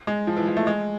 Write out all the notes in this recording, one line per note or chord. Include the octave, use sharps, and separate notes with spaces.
G#3
F3
E3
F3
A3
G#3